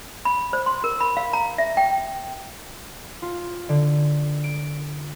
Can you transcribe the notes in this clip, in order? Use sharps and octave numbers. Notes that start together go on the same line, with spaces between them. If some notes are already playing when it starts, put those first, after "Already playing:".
B5
C5
C6
A#4
B5
F5
A#5
E5
G5
F4
D3
D7